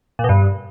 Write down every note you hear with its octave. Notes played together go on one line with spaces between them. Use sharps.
A#2
B2
G2